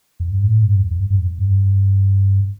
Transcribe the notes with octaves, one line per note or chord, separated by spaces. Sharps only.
F2
G2
A2
G2
F2
F2
G2
G2
F2
G2